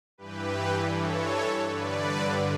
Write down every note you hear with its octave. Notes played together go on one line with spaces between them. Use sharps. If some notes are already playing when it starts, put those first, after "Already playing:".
G2 E3 G4 B4
A4 C#5
G2 D3 B4 D5